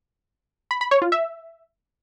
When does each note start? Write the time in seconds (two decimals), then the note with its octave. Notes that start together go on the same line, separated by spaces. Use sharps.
0.71 B5
0.81 B5
0.91 C#5
1.02 F4
1.12 E5